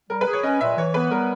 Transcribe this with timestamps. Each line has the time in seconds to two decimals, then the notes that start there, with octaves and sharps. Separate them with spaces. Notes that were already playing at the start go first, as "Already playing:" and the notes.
0.10 G3 A#4
0.21 B4
0.27 G#4
0.33 C#5
0.43 C#4 D#5
0.61 A#2 E5
0.77 E3 C#5
0.94 B3 B4
1.11 G3 A#4